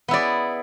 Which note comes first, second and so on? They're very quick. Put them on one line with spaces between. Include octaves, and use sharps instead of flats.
B3 E4 D5 G#4